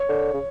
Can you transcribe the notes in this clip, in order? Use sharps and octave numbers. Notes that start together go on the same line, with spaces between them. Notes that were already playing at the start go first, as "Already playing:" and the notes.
Already playing: C#5
D3
C#3